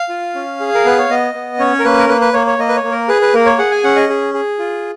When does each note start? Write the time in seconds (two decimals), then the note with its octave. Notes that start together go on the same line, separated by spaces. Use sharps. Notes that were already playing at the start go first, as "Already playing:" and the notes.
Already playing: F5
0.09 F4
0.35 C#4
0.60 G#4
0.75 A#4
0.85 B3 B4
0.98 C#5
1.09 B3 D#5
1.34 B3
1.59 C#4 C#5
1.79 A#4
1.85 A#3 B4
1.99 A#4
2.09 A#3 B4
2.21 B4
2.33 A#3 C#5
2.47 C#5
2.59 A#3 D#5
2.68 B4
2.76 C#5
2.83 A#3
2.92 A#4
3.08 G#4 B4
3.22 B4
3.34 A#3 A#4
3.46 C#5
3.58 G#4 F#5
3.71 G#5
3.84 C#4 F#5
3.96 D#5
4.09 G#4
4.34 G#4
4.59 F4